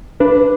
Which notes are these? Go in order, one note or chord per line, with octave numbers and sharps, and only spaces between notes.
D4 B4